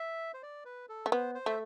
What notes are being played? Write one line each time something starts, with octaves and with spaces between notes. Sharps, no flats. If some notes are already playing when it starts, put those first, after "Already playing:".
Already playing: E5
C5
D5
B4
A4
A3
B3 C5
C5
A3 E5